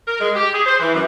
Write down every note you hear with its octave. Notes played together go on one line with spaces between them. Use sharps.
A#4
G#3
G4
G#4
C5
E3
F#2